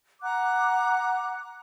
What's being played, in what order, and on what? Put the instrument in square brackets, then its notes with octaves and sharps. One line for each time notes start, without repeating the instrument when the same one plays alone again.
[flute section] F#5 A#5 D6 F#6